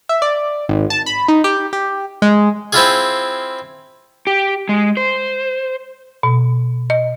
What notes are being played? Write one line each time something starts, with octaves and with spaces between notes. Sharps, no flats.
E5
D5
G#1
A5
B5
D#4
G4
G4
G#3
C4 E4 F4 G#4
G4
G#3
C5
B2
D#5